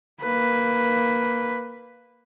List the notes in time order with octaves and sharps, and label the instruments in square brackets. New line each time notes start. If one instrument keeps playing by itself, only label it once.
[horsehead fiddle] A#3 B4